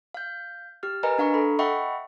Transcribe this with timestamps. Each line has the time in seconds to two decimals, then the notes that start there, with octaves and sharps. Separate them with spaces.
0.14 F5 G6
0.83 G4 F6
1.03 A#4 B4 D#5 G#5 A#5
1.18 D4 F5 A#5 C#6
1.34 A4 B5
1.59 D#5 E5 F#5 G5 B5 C#6